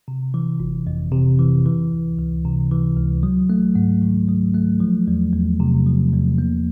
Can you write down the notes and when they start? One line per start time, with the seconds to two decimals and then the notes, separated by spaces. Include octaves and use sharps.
0.08 C3
0.34 E3
0.60 G1
0.87 F2
1.12 C3
1.39 E3
1.66 E3
1.91 C#2
2.19 C#2
2.45 C3
2.71 E3
2.96 C#2
3.23 F#3
3.50 A3
3.75 G#2
4.02 D#3
4.29 F#3
4.54 A3
4.80 F3
5.08 E2
5.33 E2
5.60 C3
5.87 F3
6.13 E2
6.38 A#3